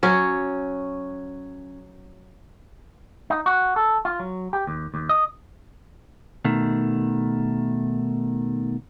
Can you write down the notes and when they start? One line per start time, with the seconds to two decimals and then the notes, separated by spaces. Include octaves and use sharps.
0.03 F#3 C#4
3.30 D#4
3.46 F#4
3.76 A4
4.05 F4
4.19 F#3
4.53 G4
4.67 D#2
4.94 D#2
5.09 D#5
6.45 B2 D#3 A3